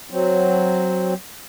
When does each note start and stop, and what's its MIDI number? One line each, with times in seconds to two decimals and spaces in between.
0.10 1.14 54
0.10 1.14 60